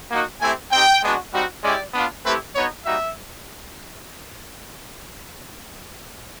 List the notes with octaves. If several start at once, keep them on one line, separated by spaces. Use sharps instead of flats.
A#3 D#4 F#4
A3 C4 E4 G4 G#5
C4 D#4 G4 G5
G#3 B3 D4 F#4
G3 C4 D#4 F#4
G#3 C#4 E4 G4 D5
B3 D4 F4
A3 C4 E4 G4 B4
B3 D#4 F#4 C#5
G3 A#3 D#4 F#4 E5